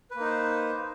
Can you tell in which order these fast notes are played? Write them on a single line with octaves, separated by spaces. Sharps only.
B4 A#3 D#4 C5